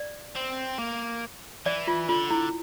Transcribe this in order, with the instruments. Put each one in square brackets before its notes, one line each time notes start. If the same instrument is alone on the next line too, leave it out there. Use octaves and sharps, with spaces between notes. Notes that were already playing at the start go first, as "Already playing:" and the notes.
Already playing: [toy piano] D5
[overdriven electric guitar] C4
A#3
[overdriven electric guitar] E3 [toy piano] D5
[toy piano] F4
[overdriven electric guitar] D3 [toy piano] F4
[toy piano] E4